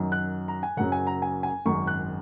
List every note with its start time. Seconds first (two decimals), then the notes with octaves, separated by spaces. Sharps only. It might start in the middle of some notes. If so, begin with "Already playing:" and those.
Already playing: F#2 D#3 F#3
0.12 F#6
0.48 A#5
0.63 G#5
0.77 F#1 F#2 C#3 F#3 F#5
0.92 G#5
1.07 A#5
1.22 G#5
1.43 G#5
1.66 G#1 F#2 C#3 G#3 C#6
1.87 F#6